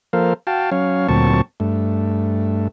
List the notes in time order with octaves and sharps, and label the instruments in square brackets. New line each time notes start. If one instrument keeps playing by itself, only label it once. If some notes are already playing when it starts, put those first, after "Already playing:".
[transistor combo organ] F3 A#3 A4 A#4 C5 F5
F#4 F5 G5 A5
F#3 C#4 C#5 F5
D2 A#2 F#3 C4 A5 C#6
G2 A3